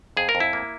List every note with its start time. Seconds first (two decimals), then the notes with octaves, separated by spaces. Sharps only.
0.17 F2 G#4
0.29 A#4
0.35 F2
0.40 E4
0.53 A#3